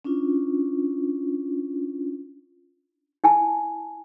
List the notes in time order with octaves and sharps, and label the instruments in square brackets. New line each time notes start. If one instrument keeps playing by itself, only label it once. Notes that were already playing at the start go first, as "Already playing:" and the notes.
[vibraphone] C#4 D4 E4 F4
[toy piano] E4 G#5 A5